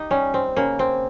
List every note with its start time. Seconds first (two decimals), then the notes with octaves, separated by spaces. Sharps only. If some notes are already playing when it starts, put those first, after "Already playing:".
Already playing: D#4 G4
0.11 G3 C#4
0.34 C4
0.57 C#3 A#3
0.79 C4